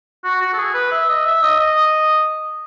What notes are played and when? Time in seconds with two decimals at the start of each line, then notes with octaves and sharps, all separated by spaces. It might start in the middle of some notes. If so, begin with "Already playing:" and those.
0.24 F#4
0.41 F#4
0.53 A4
0.58 G#4
0.74 B4
0.92 E5
1.09 D#5
1.26 E5
1.43 D#5
1.59 D#5